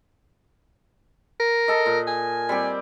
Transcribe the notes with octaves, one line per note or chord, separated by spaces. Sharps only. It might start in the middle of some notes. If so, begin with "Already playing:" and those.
A#4
A4 D#5
A#2
G#5
G3 C4 G4